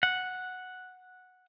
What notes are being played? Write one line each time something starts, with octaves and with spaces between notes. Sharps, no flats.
F#5